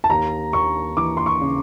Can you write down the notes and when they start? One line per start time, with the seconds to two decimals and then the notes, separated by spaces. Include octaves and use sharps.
0.04 A5
0.10 D#2 A#5
0.53 D#2 C#6
0.97 E3 D6
1.17 C6
1.26 C#6
1.41 C#3